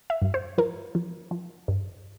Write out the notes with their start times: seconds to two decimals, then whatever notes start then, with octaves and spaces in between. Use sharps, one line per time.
0.10 E5
0.22 G2
0.34 C5
0.58 F3 A#4
0.95 F3
1.31 F3
1.68 G2